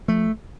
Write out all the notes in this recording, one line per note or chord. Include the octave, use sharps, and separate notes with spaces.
F3 A3